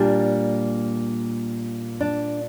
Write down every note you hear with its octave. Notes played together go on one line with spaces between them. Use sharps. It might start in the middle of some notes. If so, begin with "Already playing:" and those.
Already playing: A#2 G3 D4
D4